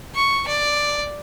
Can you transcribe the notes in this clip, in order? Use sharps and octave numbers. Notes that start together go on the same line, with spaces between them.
C#6
D5